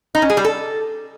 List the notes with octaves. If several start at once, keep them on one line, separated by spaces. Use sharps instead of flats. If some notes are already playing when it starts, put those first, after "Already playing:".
D#4
C#4
G#4
G3
A4